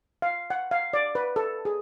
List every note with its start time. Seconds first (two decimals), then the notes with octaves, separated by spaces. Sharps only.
0.22 F5
0.50 F#5
0.71 F5
0.93 D5
1.15 B4
1.36 A4
1.65 G#4